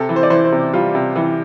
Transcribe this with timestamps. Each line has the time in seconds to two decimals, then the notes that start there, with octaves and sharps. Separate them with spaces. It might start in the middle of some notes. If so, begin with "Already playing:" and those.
Already playing: C3 A4
0.09 E3
0.16 C5
0.23 D5
0.30 E3 C5
0.45 C5
0.52 C3
0.73 G3 F4
0.95 C3
1.16 E3